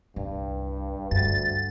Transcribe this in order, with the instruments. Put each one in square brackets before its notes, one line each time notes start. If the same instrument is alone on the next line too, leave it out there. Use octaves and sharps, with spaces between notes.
[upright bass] C2 [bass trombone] G2
[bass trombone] D2 [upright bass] G2 [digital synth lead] A6